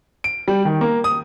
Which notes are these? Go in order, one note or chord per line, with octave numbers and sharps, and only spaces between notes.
D7
G3
D#3
A#3
D#6